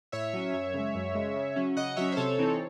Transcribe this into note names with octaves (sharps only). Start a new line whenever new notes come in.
A2 C#5 E5
F#3 C#4
F#2
C#3 G#3
F#2
C#3 G#3
C#3
F#3 C#4
C#3 D#5 F#5
F#3 C#4 C#5 E5
C5
C3 A4 C#5
E3 C4 D#4